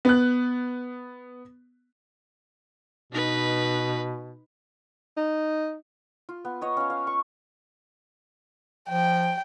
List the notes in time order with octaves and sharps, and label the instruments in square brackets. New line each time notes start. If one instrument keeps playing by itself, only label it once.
[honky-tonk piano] B3 F#6
[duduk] B2 [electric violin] D#4 B4
[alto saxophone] D#4
[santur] F4
B3
B3 C#5 D#5
C#4 F5
F5
C#6
[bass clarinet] F3 [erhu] G5